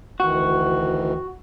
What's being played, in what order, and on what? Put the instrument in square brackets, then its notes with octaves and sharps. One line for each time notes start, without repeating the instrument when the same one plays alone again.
[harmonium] D2 D#3 E3 [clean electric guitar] F#4